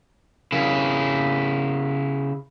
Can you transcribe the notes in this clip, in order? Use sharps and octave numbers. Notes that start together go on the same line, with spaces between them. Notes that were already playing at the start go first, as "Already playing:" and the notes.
C#3 E4